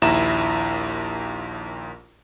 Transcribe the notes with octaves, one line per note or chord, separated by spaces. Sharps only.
A#1 D#2 E4 A#5 E7